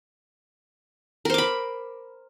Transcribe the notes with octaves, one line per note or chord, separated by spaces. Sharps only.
A#4 C5 B5 D6